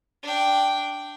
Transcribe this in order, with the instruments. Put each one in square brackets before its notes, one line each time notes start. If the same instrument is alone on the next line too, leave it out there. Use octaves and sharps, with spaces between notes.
[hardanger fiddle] D4 G5